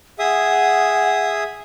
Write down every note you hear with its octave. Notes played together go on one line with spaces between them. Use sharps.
G#4 E5 F#5 D#6